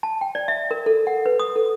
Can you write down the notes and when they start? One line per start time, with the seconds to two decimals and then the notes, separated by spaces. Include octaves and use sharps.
0.03 A5
0.21 G5
0.35 D5
0.48 E5
0.71 A#4
0.86 A4
1.07 F#5
1.26 B4
1.40 D#6
1.56 A4